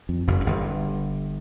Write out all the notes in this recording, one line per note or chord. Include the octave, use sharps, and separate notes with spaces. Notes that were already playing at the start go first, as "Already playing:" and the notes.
F2
F#1 F#2
F#2
G1 G2